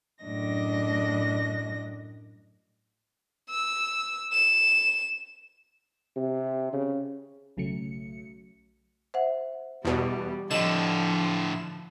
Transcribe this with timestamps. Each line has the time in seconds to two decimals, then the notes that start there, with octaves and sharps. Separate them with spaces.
0.23 F#2 A2 D4 D#5 A#6
3.50 E6
4.33 E7
6.16 C3
6.73 C#3
7.57 B1 C#3 F#3 A3 C#7
9.14 C5 E5 F#5
9.85 E2 B2 G3
10.51 A2 D3 F3 D#5 E7